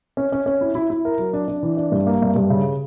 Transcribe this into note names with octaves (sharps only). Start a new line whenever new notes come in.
C#4
C#4
C#4
E4
E4
E4
A#4
F#3
D4
D4
E3
D4
G2
A#3
G2
G2
C#3